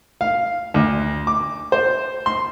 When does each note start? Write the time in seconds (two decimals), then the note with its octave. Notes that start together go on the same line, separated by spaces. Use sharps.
0.21 F5
0.74 D2
1.27 D6
1.72 C5
2.26 C6